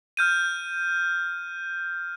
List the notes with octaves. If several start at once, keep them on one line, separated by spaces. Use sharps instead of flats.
F6 G6 D#7